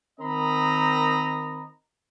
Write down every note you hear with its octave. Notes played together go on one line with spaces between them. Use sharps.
D#3 C4 A#4 D#5 A#5 B5